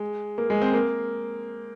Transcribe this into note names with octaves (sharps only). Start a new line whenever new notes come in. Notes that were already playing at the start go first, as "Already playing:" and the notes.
Already playing: G#3
A#3
G#3
C4
A#3